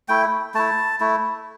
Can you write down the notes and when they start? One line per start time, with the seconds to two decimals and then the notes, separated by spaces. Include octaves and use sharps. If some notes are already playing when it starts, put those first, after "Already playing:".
0.09 A3 E4 G5
0.54 A3 E4 A5
1.00 A3 E4